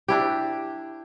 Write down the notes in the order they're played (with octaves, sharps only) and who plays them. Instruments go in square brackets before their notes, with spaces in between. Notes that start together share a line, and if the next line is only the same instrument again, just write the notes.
[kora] D4 E4 G4